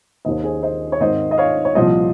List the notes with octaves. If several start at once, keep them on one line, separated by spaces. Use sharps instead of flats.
D#2 D#3 C5 D#5
G#4 C5
C5 D#5
C#5
G#1 G#2 D#3 C5 D#5
D#5
C#5 F5
C#5
C2 A#2 F3 C5 D#5